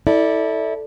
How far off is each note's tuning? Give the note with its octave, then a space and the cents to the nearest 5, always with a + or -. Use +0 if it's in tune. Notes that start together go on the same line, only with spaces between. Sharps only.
E4 -25 A4 +0 D5 +0